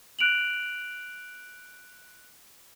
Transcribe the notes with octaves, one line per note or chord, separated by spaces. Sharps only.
F#6 D7 F7 F#7